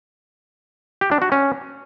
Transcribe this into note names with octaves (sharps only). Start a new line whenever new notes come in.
G4
D4
F#4
C#4